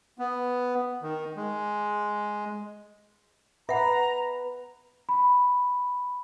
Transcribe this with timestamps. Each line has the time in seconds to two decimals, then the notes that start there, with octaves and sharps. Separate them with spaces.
0.19 B3
1.02 D#3
1.36 G#3
3.69 B4 E5 F#5 A#5
5.09 B5